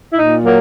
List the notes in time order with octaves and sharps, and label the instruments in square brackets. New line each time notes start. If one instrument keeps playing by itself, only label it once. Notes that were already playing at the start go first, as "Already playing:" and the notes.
[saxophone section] E4
A#2 D#4
F#3 A#3